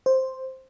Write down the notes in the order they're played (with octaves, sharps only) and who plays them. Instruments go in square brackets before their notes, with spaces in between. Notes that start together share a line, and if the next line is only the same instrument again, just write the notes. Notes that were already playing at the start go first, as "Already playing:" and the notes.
[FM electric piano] C5